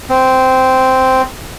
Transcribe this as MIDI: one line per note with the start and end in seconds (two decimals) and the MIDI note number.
0.10 1.22 60